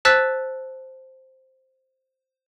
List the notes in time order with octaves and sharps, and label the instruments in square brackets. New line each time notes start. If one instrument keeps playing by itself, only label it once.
[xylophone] C5 A5 E6 F#6 A6 B6